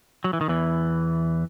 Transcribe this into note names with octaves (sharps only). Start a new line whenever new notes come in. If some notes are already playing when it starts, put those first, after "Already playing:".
F#3
E3
D#3
E2 E3